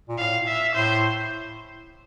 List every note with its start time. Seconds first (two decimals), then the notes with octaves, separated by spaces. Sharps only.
0.09 A#2
0.18 A2 F5
0.47 E5
0.74 A2 C5